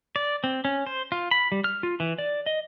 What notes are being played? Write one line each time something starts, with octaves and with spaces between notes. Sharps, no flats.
D5
C4
C#4
C5
F4
B5
G3
F6
F4
E3
D5
D#5